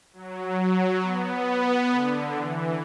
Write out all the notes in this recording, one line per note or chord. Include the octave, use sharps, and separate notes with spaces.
F#3
B3
D3
E3